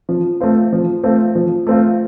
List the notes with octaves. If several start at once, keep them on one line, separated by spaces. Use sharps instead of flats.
F3
A3 C4 F4
F3
A3 C4 F4
F3
A3 C4 F4